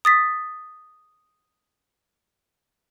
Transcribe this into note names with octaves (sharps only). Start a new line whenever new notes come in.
D#6 A6 B6